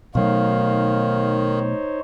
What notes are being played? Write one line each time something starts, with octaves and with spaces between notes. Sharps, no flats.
B2 D#3 F#3 A3 D#4 C5 C#5 F5